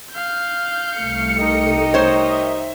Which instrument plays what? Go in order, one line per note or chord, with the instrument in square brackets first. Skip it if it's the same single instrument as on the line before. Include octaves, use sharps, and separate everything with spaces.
[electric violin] F5 G6
[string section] C2 A3 C#7
[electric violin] D#4 [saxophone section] G4 A#4 D#5
[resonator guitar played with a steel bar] C5 C#5
[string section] E5